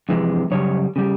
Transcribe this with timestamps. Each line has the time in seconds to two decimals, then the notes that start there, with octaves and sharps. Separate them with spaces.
0.09 F2 C3 E3 G#3
0.51 F#2 C#3 G3 C#5
0.96 C#3 G3